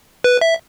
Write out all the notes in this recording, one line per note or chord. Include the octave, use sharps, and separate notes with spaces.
B4
E5